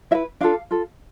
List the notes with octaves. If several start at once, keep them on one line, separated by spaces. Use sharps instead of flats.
E4 B4 E5
D4 F4 A4 F5
F4 A4